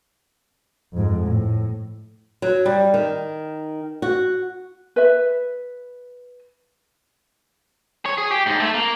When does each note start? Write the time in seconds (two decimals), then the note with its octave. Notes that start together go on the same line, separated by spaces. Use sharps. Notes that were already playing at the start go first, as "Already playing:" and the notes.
0.93 F2 G#2
1.27 A2
2.42 F#3
2.66 G3
2.94 D#3
4.02 F#4
4.96 B4 E5
8.06 C#5
8.18 G#4
8.32 G4
8.46 G#2
8.60 A3
8.74 A#3